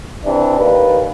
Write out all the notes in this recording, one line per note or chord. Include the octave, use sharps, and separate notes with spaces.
C3 E3 D4
D#2 B4